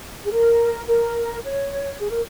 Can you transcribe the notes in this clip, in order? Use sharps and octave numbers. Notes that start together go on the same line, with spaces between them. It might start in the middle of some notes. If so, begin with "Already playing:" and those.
G#4
A#4
A#4
C#5
G#4
A#4